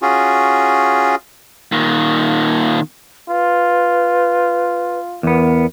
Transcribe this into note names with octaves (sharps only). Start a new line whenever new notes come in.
C#4 F4 F#4 G#4
A#2 D#3
F4 B4
E2 B3 A#4